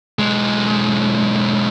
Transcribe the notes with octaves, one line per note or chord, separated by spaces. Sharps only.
B1 G#3